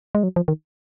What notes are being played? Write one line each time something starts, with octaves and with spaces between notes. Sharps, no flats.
G#3
F#3
F3
D#3